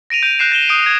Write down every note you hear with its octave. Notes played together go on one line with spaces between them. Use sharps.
A#6 D7 D#7 F7
G6 D7 D#7 F7
F#6 G6 C7 E7
A#6 E7 G7
D#6 G6 D7
G#6